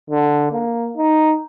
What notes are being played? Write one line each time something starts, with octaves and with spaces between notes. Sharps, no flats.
D3
A#3
D#4